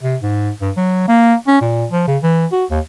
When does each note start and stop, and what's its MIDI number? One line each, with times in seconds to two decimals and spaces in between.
0.03 0.17 48
0.22 0.51 44
0.62 0.71 43
0.77 1.04 54
1.08 1.34 58
1.47 1.57 61
1.61 1.86 46
1.91 2.05 53
2.08 2.17 49
2.23 2.46 52
2.52 2.65 66
2.70 2.80 39